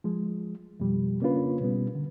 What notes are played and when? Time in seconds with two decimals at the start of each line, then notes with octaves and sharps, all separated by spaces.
0.04 F3 G#3
0.80 F2 B2 F3 G3
1.21 C#3 A#3 C#4 D4 F4 B4
1.60 B2 G3 B3
1.95 D3